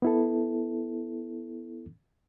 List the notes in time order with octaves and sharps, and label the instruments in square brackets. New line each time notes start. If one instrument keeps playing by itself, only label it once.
[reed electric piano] B3 E4 A4